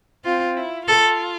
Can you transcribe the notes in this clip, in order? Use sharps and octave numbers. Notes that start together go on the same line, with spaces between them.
C4 F4
E4
F4 A4